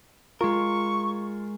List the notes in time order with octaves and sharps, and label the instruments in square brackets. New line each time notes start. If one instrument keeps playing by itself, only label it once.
[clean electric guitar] G#3 A#4 [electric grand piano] F4 [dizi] C#6